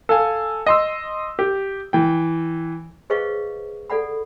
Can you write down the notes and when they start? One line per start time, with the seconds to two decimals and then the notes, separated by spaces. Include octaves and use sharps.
0.09 A4 F5 G#5
0.66 D#5 C6 E6
1.39 G4
1.93 E3 G5
3.10 G#4 B4 C5 D#5 F5 C#6
3.90 A4 D5 F#5 B5